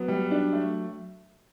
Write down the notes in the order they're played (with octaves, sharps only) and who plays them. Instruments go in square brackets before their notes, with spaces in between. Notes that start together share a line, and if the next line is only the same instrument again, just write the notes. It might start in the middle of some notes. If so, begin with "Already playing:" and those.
Already playing: [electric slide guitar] F#3 [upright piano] B3
[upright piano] G3
D4
A3